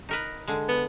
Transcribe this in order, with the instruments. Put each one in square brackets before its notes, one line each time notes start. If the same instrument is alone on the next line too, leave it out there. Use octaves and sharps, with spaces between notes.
[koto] D#4 A#4 B4
D3 G#3
[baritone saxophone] B3